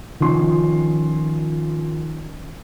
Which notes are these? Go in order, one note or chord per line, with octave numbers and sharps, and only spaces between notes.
D#3 F3 C#4 C6